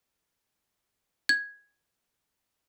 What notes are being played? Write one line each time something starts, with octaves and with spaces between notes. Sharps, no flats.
G#6